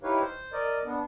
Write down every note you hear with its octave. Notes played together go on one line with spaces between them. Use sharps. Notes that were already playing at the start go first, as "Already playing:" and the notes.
D#4 E4 G4 B4 C#5 F5
C5
A#4 D5 D#5
B3 D4